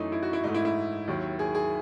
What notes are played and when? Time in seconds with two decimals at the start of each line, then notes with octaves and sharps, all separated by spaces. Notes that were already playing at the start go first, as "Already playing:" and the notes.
Already playing: F#2 E3 A3 D#4
0.12 E4
0.23 F#4
0.33 E4
0.44 G#2 E3 A3 D#4
0.54 E4
0.65 E4
1.08 D#2 D#3 F#3
1.39 G#4
1.55 G#4